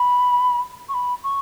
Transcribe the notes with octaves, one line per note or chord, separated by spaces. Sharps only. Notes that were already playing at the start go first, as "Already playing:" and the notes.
Already playing: B5
C#6
B5
C#6